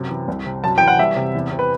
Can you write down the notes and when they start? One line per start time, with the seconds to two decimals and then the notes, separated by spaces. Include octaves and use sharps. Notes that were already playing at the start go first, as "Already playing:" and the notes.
Already playing: F#2 C3
0.10 E3
0.28 C2
0.46 C3
0.63 F#2 A5
0.78 E3 G5
0.88 F#5
0.99 G3 E5
1.16 C3
1.34 E2
1.52 C3
1.59 B4